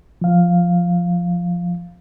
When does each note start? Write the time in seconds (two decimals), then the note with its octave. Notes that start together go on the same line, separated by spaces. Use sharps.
0.22 F3 F5